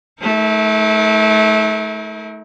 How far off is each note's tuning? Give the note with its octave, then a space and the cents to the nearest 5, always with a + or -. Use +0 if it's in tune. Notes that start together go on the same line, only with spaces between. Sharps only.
A3 -25 D#4 +45 A#4 +0